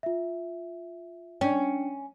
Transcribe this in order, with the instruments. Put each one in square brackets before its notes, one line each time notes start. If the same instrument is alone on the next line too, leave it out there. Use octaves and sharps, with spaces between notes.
[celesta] F4 E5
[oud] C#4 [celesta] D4 G5